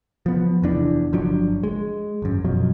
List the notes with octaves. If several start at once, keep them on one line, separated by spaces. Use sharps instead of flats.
F3 B3
F1 E2 D4
G1 F3 F#3 D4
G#3
G#1 F#2
F#2 B2 F3 F#3